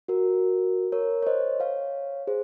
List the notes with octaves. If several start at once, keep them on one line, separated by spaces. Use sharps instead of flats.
F#4 A#4
A#4 C#5
C#5
C5 D#5
C#5 F5
G#4 C5